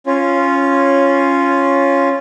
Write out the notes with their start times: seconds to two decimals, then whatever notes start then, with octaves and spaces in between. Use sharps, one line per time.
0.06 C#4 F4